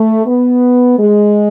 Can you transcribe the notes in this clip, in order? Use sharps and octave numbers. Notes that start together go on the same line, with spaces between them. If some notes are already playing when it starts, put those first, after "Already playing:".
Already playing: A3
B3
G#3